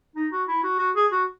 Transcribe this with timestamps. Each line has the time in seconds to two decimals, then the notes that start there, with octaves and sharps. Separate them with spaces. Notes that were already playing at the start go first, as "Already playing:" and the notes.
0.16 D#4
0.32 F#4
0.48 E4
0.63 F#4
0.79 F#4
0.96 G#4
1.12 F#4